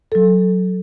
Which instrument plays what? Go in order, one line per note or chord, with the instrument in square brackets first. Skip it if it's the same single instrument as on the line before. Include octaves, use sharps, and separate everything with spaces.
[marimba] F#3 A4